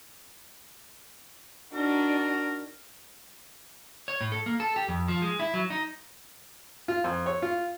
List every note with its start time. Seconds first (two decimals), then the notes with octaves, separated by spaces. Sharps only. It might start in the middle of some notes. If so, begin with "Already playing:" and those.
1.75 D4 D#4 F#4 A#4
4.08 C#5
4.21 A2
4.32 A4
4.46 A#3
4.60 A4
4.76 G4
4.88 F2
5.08 F3
5.22 G#3
5.40 E4
5.54 F#3
5.70 D#4
6.88 F4
7.04 F2
7.26 C#5
7.42 F4